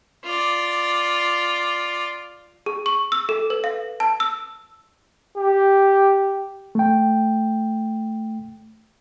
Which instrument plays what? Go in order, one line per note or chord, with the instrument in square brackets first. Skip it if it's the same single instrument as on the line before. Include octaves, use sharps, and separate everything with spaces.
[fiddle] F4 D5
[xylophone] G#4
C#6
E6
A4
B4
F5
A5
E6
[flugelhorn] G4
[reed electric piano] A3 G5